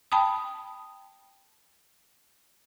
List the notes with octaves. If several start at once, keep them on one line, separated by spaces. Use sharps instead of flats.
G5 A5 B5 D#6